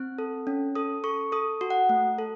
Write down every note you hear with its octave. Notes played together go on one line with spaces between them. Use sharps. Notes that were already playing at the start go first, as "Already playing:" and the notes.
Already playing: C4 F#6
A4
C#4
A4 D#6
A4 C#6
A4 D#6
F#4
F#5
A3
A4